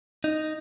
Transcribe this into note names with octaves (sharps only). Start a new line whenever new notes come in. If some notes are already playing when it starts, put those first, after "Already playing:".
D#4